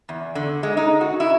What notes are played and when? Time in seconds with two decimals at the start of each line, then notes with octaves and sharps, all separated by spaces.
0.09 E2
0.35 D3
0.63 G#3
0.77 D#4
1.01 F#4
1.20 E4